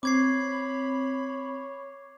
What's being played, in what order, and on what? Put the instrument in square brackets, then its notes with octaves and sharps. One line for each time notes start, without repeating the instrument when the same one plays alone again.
[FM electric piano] C4 [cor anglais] C#5 [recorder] B5 [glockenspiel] D6 G#6 C7